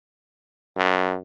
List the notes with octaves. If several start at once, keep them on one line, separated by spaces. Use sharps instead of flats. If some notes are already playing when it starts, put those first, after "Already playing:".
F#2